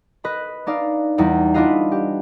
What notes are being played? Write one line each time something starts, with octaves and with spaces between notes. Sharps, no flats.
B4 D#5 B5
D4 D#4 D5 F5
E2 G3 D#4 E4
D4 E4 F4 B4 D#5 F5
G4